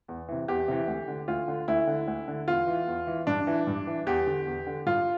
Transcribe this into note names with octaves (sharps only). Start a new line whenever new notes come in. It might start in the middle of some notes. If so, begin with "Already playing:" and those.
E2
C3 E3
E2 G4
C3 E3
D2
D3
D2 F4
D3
D2 E4
D3
D2
D3
E2 F4
E3
E2
E3
G2 D4
E3
G2
E3
E2 G4
D3
E2
D3
G2 F4